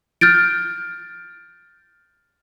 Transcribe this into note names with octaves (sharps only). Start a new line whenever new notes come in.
F6 G6 A6 D7